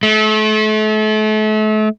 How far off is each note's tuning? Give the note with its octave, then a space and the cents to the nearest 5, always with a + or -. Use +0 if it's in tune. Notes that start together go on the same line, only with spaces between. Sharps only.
A3 -35